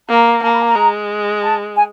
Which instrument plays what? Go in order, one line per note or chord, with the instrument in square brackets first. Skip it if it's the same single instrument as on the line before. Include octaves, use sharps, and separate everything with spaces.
[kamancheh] A#3 [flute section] A#5
[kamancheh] A#3 [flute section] A5
[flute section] B5
A5
A#5
[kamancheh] G#3
[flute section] A5
G#5